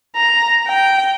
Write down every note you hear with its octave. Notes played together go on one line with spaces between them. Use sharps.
A#5
G5